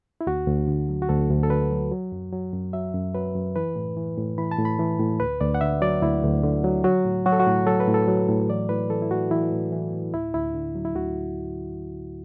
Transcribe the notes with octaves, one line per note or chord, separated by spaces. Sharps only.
E4
D2 F#4
D2
D3
F#3
F#4
D2 A4
D2
A4
D3 B4
F#3
F#3
F#2
F#3
F#2
F#3 E5
F#2
F#3 B4
F#2
E3 B4
A2
E3
A2
E3 B5
A5
A2
B5
E3
A2
D2 B4
D2 D5
F#5
D3 E5
F#3 D5
D2 E4
D2
D3
F#3
F#3 F#4
A2
F#3 F#4
A4
F#4
A2
F#3 A4
B4
A2
A4
F#3
A2
E3 D5
A2 B4
E3 A4
E4
A2 F#4
E3 E4
A2
E3
A2
D2 E4
D2 E4
D3
F#3
E4
D2 F#4